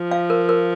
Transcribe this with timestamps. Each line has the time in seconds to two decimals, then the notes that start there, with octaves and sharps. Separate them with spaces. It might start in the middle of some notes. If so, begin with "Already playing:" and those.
Already playing: F3
0.11 F5
0.30 A#4
0.49 A#4